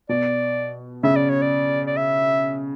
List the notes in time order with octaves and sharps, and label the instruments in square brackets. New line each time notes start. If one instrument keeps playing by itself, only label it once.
[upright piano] B2 [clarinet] D5
[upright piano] C#3 [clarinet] E5
[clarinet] D5
C#5
D5
D5
E5